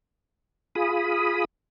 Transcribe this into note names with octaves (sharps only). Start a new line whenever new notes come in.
F4 G#4 B5 D#6